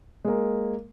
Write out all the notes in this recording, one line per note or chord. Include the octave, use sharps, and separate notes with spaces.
G#3 A#3